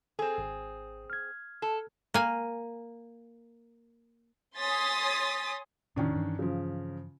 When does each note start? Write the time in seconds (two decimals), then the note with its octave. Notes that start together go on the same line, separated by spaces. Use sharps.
0.19 C4 G#4 A4
0.38 G#1
1.10 F6 G#6
1.62 A4
2.14 A#3 G#5
4.57 C#5 G#5 C6 D#6 A6 B6
5.96 E1 A2 C3 D#3 C#4 D4
6.16 G2 E3
6.39 C#3 F3